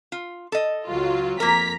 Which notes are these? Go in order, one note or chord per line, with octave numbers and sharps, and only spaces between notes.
F4
A4 D#5
C#2 F#3 F4
F2 A#3 A#4 A#5 B6